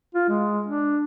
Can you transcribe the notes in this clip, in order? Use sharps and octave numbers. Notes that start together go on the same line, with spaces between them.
F4
G#3
D4